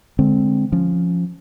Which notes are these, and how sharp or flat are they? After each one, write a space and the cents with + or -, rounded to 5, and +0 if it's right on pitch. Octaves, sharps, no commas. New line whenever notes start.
D3 +0 G#3 +0 C4 +0
F3 +0 C#4 +0